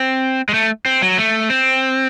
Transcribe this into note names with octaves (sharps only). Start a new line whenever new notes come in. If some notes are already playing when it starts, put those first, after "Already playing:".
Already playing: C4
G#3
A3
C4
F#3
A3
C4